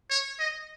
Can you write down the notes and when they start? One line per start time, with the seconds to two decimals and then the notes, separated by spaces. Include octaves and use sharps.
0.10 C#5
0.40 D#5